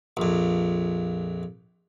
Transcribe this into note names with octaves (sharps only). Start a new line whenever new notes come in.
A#1 F2